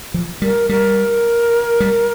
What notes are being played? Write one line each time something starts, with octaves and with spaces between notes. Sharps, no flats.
F3
G3 A#4
G3 A#4
G3